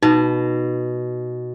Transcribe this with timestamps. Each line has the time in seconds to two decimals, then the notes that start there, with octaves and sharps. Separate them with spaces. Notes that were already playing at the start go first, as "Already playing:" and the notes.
0.02 B2 D#4